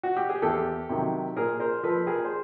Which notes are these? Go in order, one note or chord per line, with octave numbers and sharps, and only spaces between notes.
F#4
G4
G#4
E2 G4 A4
C3 D#3 F#3
A#2 G#4 A#4
A#4 C5
F3 A4 B4
G#4 A#4
C5